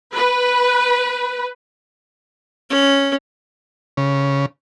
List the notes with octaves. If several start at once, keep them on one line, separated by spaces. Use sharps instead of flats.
B4
C#4
C#3